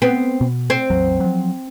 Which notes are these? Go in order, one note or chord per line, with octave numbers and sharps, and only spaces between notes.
B3 C4
B2
C4
A1 E2 F#3
F3 F#3